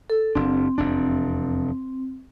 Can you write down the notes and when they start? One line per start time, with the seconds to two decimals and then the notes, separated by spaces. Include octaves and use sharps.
0.10 A4
0.35 F#1 C4 D4
0.78 F1 E2 D4